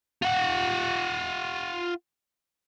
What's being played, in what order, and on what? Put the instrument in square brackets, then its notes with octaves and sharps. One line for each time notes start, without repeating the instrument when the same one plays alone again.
[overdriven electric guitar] F4 F#5